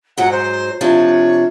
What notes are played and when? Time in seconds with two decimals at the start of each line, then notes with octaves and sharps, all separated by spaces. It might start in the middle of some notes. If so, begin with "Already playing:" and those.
0.17 G#2 F#3 F#5
0.31 C5
0.81 C3 F3 D4 C#5